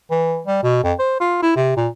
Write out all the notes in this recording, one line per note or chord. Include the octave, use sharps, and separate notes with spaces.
E3
G3
B2
F2
C5
F4
E4
C3
A#2